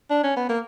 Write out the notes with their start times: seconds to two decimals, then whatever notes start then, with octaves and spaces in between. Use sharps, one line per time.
0.10 D4
0.23 C#4
0.37 B3
0.49 A#3